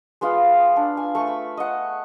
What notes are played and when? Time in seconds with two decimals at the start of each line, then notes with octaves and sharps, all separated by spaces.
0.21 G#3 B3 F4 F5
0.76 D4
0.97 G#5
1.15 A3 C#6
1.27 B5
1.57 D#5 F#5